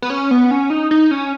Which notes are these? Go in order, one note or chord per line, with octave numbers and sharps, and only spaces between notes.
B3
C#4
B3
C#4
D#4
D#4
C#4